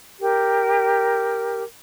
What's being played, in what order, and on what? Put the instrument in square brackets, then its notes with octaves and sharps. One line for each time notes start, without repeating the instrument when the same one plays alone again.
[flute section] G4 A#4